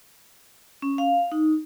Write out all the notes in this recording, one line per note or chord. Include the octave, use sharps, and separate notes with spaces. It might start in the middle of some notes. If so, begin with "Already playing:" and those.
C#4
F5
D#4